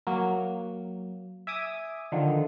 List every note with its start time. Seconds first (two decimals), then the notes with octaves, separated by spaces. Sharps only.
0.07 F#3 A#3
1.47 E5 G#5 D6 D#6
2.12 D3 D#3 F3